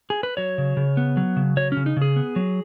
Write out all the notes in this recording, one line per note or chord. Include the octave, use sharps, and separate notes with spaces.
G#4
B4
F#3 C#5
C#3
C#3
B3
F#3
C#3
F#3 C#5
C#3 C#4
D#4
C#3
G#4
B3
F#3